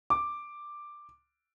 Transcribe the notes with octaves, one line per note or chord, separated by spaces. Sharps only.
D6